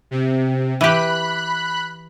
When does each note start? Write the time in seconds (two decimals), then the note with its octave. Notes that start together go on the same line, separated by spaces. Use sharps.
0.11 C3
0.81 E3 G4 B5 F#6